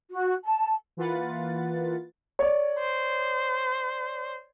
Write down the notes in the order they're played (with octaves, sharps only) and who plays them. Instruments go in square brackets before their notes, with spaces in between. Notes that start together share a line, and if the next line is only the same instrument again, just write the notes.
[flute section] F#4
A5
[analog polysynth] E3 A#3 F4 B4 F#5 A6
[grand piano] C#5 D5
[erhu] C5